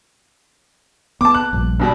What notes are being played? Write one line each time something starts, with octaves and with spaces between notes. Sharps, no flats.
B3 A5 D6
F#6
A#1 G2
G2 B2 G3